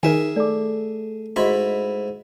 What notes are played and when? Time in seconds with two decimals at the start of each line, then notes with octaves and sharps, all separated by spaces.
0.03 D#3 D#4 G#4 A#4 E5 G#5
0.36 A3 A4 D5 D6
1.36 G#2 E4 F#4 D#5 B5 C#6